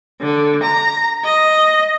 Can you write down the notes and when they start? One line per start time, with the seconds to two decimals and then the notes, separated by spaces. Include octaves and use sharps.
0.21 D3
0.63 A#5
1.25 D#5